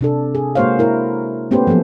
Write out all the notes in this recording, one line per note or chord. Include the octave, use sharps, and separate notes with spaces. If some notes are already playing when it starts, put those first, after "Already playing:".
C3 D4 A4
G#4
G#3 A#3 F#4 C5 C#5 F5
E4 A#4
A3 B3 C#4 G4 B4 C5
F3 F#3 A#3 B3 A4